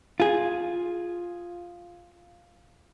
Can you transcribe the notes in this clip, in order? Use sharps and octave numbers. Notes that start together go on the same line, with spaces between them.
F4 G#4